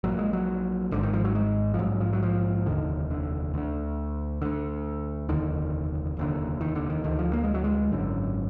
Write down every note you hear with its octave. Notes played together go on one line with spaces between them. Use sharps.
A#1 A#2 F#3
G#3
F#3
G#1 G#2 D3
D#3
F3
F#3
G#3
F3
A#1 G#2 F#3
F3
F#3
F3
F1 D#2 D3 D#3
D3
D2 D3 D#3
D2 D3
F1 D#2 D3 D#3
F1 D#2 D3
D#3
D3
D#3
D2 D3 D#3
F3
A#3
G#3
F#3
G#3
G#1 F#2 D3